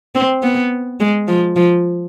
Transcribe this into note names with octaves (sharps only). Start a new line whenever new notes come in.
C4
B3
G#3
F3
F3